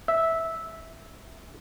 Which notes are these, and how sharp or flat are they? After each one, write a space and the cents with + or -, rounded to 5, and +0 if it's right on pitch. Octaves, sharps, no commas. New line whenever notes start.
E5 -10